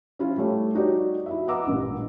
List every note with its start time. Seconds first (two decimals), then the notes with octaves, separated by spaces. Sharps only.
0.19 C#4 E4 F4
0.37 G3 A3 C#5
0.75 D#4 F#4 G4 C#5 D5
1.26 E4 F#4 E5
1.47 B4 D#5 F#5 A#5 D6 E6
1.67 A1 G2 A#2